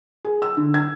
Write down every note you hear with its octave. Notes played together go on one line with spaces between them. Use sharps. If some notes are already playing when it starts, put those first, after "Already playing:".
G#4
E6
D3
G#6